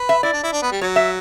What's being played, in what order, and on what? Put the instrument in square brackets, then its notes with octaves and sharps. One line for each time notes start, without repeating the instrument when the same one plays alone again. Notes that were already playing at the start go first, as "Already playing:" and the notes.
Already playing: [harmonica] B4
[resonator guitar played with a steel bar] E5
[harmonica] E4 [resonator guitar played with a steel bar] D5
[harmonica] D4
E4
D4
B3
G3
[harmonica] F#3 [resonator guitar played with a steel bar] C#5
[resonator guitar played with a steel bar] E5